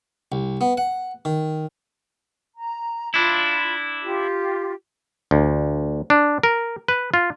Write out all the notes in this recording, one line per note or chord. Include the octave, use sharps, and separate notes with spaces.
C2
B3
F#5
D#3
A#5
D4 E4 F4 B5
F4 G4
D2
D4
A#4
B4
F4